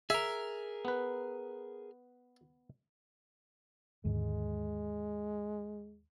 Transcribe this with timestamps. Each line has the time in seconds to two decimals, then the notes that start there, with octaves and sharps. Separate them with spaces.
0.10 G#4 A#4 E5
0.85 B3 B4
4.05 D#2 G#2 D3 G#3